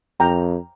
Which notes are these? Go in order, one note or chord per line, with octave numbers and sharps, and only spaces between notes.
F2 G5 A#5